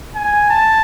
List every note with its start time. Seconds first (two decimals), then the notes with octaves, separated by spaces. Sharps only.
0.15 G#5
0.50 A5